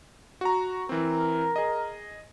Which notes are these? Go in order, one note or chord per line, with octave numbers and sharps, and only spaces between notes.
F#4 A#5
E3 C4 A#4
G#4 D#5